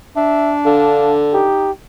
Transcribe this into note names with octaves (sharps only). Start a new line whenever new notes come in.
D4 E5
D3 F5
D#4 G4